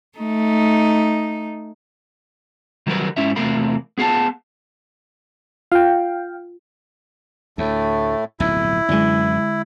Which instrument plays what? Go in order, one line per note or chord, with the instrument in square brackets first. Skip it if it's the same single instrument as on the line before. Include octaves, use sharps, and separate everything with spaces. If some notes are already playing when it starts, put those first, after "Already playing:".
[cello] A3 D#4
[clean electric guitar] D#3 F#3 G3 A#4 B4
G#2 C#4 E4 E5
E2 C3 A3 A#4 F5 B5
B3 G#4 F5 F#5 A5
[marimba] F4 [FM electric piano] F5 G5
[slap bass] D2 [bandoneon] A2 A3
[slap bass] D1 B1 F2 [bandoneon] E4
[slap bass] F#2 E3 [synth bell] D3 G#3